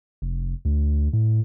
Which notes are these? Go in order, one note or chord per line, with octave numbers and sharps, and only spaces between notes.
F1
D2
A2